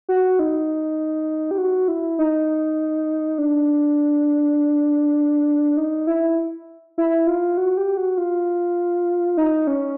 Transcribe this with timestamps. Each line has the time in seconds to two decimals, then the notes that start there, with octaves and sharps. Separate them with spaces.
0.09 F#4
0.39 D#4
1.51 G4
1.58 F#4
1.88 E4
2.19 D#4
3.38 D4
5.77 D#4
6.07 E4
6.98 E4
7.27 F4
7.57 F#4
7.77 G4
7.97 F#4
8.18 F4
9.37 D#4
9.67 C#4